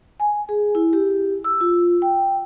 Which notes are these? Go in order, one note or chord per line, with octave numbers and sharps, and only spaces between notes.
G#5
G#4
E4
G4
E6
F4
G5